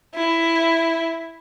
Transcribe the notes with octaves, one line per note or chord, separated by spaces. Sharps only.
E4